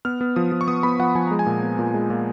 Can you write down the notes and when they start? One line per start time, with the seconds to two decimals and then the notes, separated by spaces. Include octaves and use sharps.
0.05 B3 F6
0.21 B3
0.36 F3 D#6
0.52 F3
0.61 C#6
0.68 B3 D#6
0.83 B3 B5
0.99 F3 F#5
1.15 F3 G#5
1.27 G#3 A#5
1.39 G#5
1.46 A#2
1.63 B3
1.79 A#2
1.94 G#3
2.10 A#2